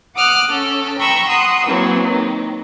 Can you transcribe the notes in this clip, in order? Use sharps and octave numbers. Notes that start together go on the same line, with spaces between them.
F#5 D6 D#6 F6 F#6
C#4 A4
G5 A#5 B5 C#6 E6
F#5 C6 D#6 E6
E3 F#3 A#3 C4
D#3